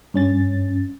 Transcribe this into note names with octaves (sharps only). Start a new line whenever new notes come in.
G2 C#4 A6